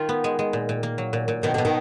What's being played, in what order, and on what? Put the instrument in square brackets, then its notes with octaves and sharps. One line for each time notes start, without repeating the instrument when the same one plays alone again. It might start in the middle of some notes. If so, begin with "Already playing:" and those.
Already playing: [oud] D#3 [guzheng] F4
[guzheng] B3
G#3
G#3
A#2
A#2
A#3
F#3
A#2
A#2
[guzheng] B2 [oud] D#3
[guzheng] B2 [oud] D3
[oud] D#3